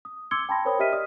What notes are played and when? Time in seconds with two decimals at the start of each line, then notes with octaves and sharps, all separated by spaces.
0.05 D#6
0.31 C6 D6 E6 G#6 C#7 G7
0.49 G5 A5 B5 C6 A#6
0.65 A#4 C5 C#5 G5 B5 D#6
0.79 G4 D#5 E5 F6 B6 D#7
0.92 G4 D5 D#5 D#6 F6